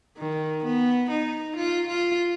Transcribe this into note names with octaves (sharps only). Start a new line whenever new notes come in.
D#3
B3
D#4
F4
F4